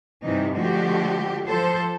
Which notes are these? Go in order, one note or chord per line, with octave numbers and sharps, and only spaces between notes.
G2 C3 D#3 E3 G3 D#4
D3 F3 G#3 A3 F#4 G4
F3 A4 C5